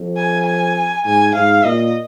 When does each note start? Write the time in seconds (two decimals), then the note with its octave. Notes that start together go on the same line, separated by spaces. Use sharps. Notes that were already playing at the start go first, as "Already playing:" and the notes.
Already playing: F2
0.17 G#5
0.46 G#5
1.05 G#2 G#5
1.35 G#2 F5
1.64 A#2 D#5